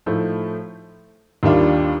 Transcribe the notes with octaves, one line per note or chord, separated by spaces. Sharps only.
A2 F3 A3 D#4
D#2 D#3 G3 D4 F4